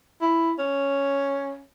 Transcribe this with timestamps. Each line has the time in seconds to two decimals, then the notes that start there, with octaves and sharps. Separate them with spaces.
0.21 E4
0.59 C#4